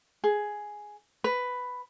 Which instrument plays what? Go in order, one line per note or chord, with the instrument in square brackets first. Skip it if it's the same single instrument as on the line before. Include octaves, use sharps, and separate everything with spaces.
[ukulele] G#4
B4